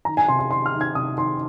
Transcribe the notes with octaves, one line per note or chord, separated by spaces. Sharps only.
D#3 A#5
G#5
C3 C6
C6
D#3 C6
F6
D#3
G#6
C3 D#6
D#3 C6